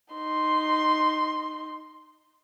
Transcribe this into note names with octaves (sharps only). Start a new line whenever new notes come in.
D#4 C6